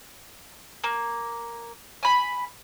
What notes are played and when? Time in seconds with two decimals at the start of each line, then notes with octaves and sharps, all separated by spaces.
0.84 A#3
2.03 G#5 B5